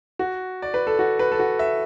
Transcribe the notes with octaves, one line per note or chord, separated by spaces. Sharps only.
F#4
D5
B4
A4
F#4
B4
A4
F#4
E5